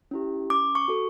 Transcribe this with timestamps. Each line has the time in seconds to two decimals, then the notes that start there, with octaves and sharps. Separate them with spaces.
0.11 C#4 E4 G4
0.50 C#4 D6
0.75 C#6
0.88 F#4 A4